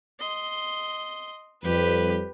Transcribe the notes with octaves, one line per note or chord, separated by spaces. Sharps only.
D#5 C6
F2 G3 G4 B4